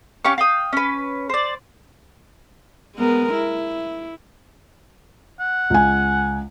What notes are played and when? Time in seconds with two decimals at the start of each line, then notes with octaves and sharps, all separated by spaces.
0.25 C#4 G4 F5 C#6
0.38 F5 G5 D#6
0.73 C#4 B4
1.30 C5 D5
2.96 G#3 B3 A#4
3.34 E4
5.40 F#5
5.70 C#2 G#5